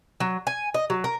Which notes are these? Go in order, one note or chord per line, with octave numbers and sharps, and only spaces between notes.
F#3
G#5
D#5
F#3
A#4